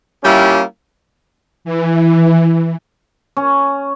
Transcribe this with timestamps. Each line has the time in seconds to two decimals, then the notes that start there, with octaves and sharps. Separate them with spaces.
0.24 G3 A#3 C#4 E4 F4 G4
1.65 E3
3.37 C#4